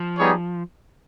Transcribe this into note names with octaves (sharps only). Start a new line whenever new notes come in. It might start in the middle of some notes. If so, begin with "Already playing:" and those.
Already playing: F3
G3 B3 D#4 G#4 C#5